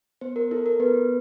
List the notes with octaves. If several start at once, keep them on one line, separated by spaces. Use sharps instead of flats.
B3 C5
A#4
E4 A4 A#4
A#4
B3 B4